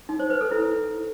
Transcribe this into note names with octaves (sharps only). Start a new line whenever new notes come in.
D#4
C5
B4
A4
E4